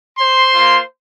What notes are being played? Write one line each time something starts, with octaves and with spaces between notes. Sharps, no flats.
C5 C6
A#3 F4